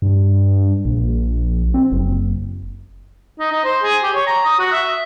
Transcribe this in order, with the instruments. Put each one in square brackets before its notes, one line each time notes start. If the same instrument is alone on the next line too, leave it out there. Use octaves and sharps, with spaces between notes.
[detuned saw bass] G2
A#1
C4
F#1
[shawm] D#4
D#4
C5
G#4
G4
C#5
A#5
D#6
F#4
E5